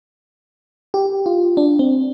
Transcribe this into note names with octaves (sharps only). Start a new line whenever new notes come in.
G4
F4
D4
C4